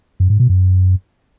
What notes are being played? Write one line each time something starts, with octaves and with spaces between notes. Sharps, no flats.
F#2
G#2
B2
F#2